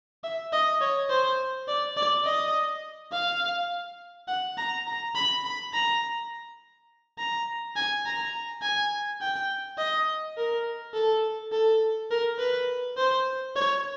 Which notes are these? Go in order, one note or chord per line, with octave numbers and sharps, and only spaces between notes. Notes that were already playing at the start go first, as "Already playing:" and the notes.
E5
D#5
C#5
C5
D5
D5
D#5
F5
F#5
A#5
A#5
B5
B5
A#5
A#5
G#5
A#5
G#5
G5
D#5
A#4
A4
A4
A#4
B4
C5
C#5